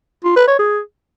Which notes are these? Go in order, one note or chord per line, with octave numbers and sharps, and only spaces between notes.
F4
B4
C#5
G#4